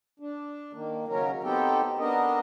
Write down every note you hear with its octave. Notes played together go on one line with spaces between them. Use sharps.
D4
D#3 A#3
C#3 F#3 C#4 A#4
B3 C4 D#4 G4 A4 G5
B3 D4 A#4 D#5